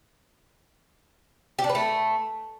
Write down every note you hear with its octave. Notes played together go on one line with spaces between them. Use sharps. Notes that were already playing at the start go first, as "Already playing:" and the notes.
G4
D4
B4
A3